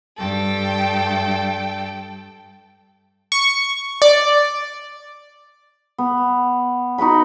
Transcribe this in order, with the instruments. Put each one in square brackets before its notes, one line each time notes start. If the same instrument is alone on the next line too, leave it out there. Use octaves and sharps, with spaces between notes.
[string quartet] G2 A4 G5
[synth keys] C#6
D5
[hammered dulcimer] B3
D#4 F#4 B4 B5